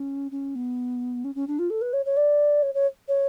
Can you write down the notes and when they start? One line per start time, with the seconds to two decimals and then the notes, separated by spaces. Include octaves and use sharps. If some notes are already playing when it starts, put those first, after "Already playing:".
Already playing: C#4
0.32 C#4
0.55 B3
1.24 C#4
1.35 C#4
1.48 D4
1.59 F4
1.70 A4
1.82 B4
1.93 C#5
2.06 C#5
2.17 D5
2.62 C#5
2.74 C#5
3.08 C#5